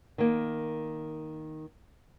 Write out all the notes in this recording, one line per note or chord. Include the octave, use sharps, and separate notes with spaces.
D#3 A#3